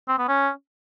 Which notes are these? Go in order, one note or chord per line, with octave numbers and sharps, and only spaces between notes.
C4
B3
C#4